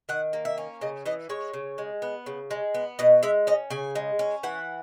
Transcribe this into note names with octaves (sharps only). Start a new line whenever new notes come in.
D#3 F#5
A#3
E5
C#4
C#3 D#5
E3 D#5
G#3 C#5
C#3
G#3
B3
C#3
G#3
B3
B2 D#5
G#3 E5
C#4 D#5
C#3 G#5
G#3
C#4
E3 F#5